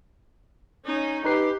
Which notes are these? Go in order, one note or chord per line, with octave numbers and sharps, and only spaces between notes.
C#4 D#4
D#4 G4 B4 C7